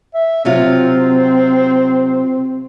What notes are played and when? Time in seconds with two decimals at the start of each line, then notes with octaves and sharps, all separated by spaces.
0.14 E5
0.45 C3 F#3 C4 F4